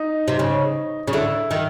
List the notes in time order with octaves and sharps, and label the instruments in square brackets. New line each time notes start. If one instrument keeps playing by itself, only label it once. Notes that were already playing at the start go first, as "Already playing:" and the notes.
Already playing: [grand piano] D#4
[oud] C3
C#3
C#3
[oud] D3 [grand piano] E4
[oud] D#3